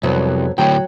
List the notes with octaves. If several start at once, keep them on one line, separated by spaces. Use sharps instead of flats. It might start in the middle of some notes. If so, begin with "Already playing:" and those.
C2 F2 F#3 B3
D2 A2 F#3 G5